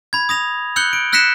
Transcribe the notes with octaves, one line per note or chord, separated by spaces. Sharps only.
B5 G#6
D#6 A#6 F7
E6 F#6 G6 C#7 F#7 G7
D7
E6 F#6 A#6 B6 C#7 E7